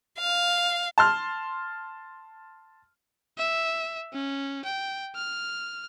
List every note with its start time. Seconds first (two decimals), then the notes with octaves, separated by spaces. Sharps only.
0.19 F5
0.98 A5 C6 F6
3.38 E5
4.13 C#4
4.65 G5
5.16 F6